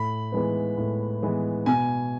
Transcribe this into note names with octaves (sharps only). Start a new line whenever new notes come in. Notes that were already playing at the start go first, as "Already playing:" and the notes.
Already playing: A2 B5
E3 G#3 B3
A2
E3 G#3 B3
B2 G#5